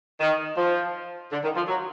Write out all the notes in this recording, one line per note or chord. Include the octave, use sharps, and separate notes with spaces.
D#3
F3
D3
D#3
F3
F#3